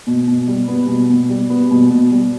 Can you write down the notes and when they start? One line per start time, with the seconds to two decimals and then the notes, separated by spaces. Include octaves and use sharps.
0.07 B2
0.27 B2
0.47 G3
0.68 B3
0.88 B2
1.09 B2
1.29 G3
1.50 B3
1.70 B2
1.90 B2
2.11 G3